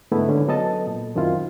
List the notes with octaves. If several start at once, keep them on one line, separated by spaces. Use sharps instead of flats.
G#2 D3 G#3 A3 B3 E4
D3 C#4
F#3 B3 A4 D#5 A5
A#2
F#2 D#3 C4 E4 F4